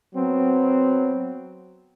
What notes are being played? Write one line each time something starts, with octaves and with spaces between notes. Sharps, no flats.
F#3 B3 C4